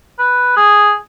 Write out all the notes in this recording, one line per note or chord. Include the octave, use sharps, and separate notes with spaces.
B4
G#4